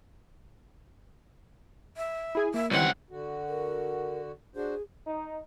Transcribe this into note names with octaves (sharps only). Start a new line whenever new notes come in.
E5
E4 G#4 G#5
A#3 E5
C#2 D#3 E3 G3 C4 F#5
D3 F#4
A#4
D4 F#4 G#4 C5
D#4